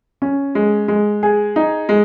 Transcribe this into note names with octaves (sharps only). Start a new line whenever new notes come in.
C#4
G#3
G#3
G#4
D#4
G#3